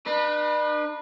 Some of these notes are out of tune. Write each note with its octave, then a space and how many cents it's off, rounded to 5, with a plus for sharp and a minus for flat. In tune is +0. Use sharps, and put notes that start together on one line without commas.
D4 +45 B4 -20